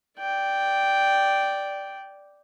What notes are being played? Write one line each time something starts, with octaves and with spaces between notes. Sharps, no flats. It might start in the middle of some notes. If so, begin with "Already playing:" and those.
D5 G5